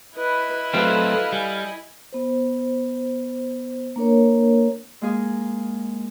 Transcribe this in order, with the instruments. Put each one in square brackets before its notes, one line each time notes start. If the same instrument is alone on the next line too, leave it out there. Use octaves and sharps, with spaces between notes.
[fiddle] E4 D#5 [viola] B4
[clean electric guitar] F#3 A3 C4 [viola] A4 B4 [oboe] F5
[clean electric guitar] G3 [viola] G#5
[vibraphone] B3 C5
A#3 D4 A#4 C#5
[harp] G#3 A#3 G#4